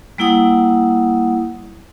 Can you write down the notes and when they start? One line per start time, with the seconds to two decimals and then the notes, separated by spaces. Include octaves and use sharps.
0.18 G3 A#3 E4 F#5 D#6